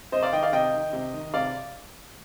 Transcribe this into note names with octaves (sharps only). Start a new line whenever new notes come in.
C3 C5 D#5
D5 F5
D#3 D#5 G5
D5 F5
C3 D#5 G5
D#3
C3
D#3
C3 D5 F5